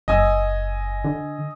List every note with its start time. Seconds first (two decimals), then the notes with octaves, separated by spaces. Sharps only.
0.08 F#1 D#5 G#5 E6
1.04 D3